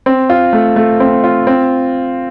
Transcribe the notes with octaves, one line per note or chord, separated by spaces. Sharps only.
C4
F4
A3
A3
C4
F4
C4